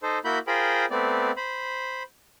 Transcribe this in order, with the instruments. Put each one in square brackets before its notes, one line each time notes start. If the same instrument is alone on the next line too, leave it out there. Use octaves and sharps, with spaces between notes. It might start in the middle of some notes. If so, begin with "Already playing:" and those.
[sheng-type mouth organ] D#4 A4 C5
A#3 E4 F#4 B5 G6
F4 G#4 A#4 C5 G5 B5
A3 B3 C4 D5
C5 B5